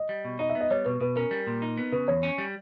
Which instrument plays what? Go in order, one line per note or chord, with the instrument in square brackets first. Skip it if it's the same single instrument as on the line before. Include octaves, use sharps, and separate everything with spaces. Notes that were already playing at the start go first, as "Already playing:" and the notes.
Already playing: [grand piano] D#5
[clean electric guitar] G3
B2
[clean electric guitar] D#4 [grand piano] D#5
[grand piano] E5
[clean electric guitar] B3
[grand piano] D#5
[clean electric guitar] G3 [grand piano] C#5
[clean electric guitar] B2 [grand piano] B4
[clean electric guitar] B2 [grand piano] B4
[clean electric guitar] C#4 [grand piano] A#4
[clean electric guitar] G3
A#2
D#4
B3
[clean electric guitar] C#3 [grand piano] B4
[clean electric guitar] E2 [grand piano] C#5
[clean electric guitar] C#4
G3